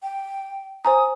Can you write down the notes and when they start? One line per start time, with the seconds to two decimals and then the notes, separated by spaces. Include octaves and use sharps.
0.03 G5
0.85 C5 G#5 A#5 D#6